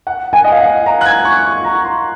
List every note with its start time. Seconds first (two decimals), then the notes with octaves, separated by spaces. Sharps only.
0.07 F#5
0.33 G#5
0.44 D#5
0.52 F5
0.59 F#5
0.86 A#5
1.01 F#6
1.06 G#6
1.25 C#6
1.45 C#6
1.64 A#5
1.85 C6